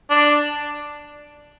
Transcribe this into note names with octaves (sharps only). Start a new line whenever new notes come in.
D4